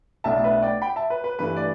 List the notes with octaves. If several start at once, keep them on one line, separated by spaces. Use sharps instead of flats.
B1 A2 A3 D4 E5 A5
B4 E5
D5 G5
G5 B5
E5 A5
B4
B4
G2 E3 A3 B4
D5